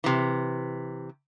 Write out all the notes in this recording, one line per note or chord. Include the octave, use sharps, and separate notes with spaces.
C3 E3